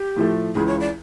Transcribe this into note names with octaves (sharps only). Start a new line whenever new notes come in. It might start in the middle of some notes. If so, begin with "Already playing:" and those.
Already playing: G4
A2 F3 A3
C#2 C#3 E3 G#4
C#5
D5